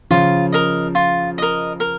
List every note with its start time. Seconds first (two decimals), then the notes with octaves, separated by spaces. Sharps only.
0.11 C#3 F3 F4
0.52 A#4 D#5
0.95 F4
1.38 A#4 D#5
1.80 A#4